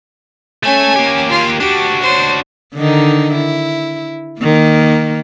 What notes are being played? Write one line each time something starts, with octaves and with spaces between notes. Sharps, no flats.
A3 C#4 A4 G#5
A#3 G4
F4
D4 F#4 G4
C5 C#5
D3 D#3 D#4
E4
D#3 A#3